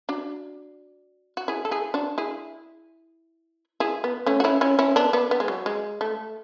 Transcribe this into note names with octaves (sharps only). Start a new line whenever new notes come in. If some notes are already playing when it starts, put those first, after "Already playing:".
D4 F#4
F#4
E4 G#4
A4
E4 G#4
D4 F#4
E4 G#4
E4 G#4
B3
A3 C#4
F#4
C#4 E4
C#4 E4
C#4 E4
B3 D4
B3 D4
B3
G#3
F#3
G#3
A3